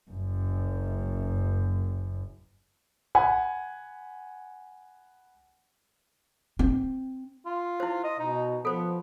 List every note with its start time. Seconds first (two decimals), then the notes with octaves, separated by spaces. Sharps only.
0.11 F#1 F#2
3.15 F#5 G#5 B5
6.59 C4
7.46 F4
7.80 E4 C5
8.04 D#5
8.20 B2 D#4
8.65 F3 B3 A4 C5